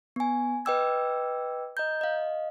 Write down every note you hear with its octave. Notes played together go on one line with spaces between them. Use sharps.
B3 G#5
B4 D#5 G5 D6 E6 G#6
D#5 A#5 G6
D#5 F5